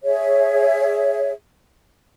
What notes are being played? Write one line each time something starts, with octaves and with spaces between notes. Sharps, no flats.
G#4 C#5 E5